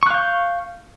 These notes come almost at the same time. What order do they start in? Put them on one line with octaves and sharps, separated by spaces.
C#6 F#6 F5 G6